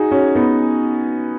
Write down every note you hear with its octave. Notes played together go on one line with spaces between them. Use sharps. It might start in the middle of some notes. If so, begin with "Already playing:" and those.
Already playing: D#4 F#4 G#4
C#4 F#4
B3 D#4